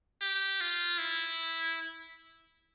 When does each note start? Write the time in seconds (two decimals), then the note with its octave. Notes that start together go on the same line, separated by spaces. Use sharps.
0.21 G4
0.61 F4
0.99 E4